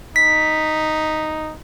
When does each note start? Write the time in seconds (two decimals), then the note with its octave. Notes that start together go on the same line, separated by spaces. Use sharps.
0.16 D#4 B6